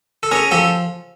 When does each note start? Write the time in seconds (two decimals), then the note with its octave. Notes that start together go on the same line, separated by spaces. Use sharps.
0.23 A4
0.31 C#4 G#4 A#4
0.51 F3 G4 A4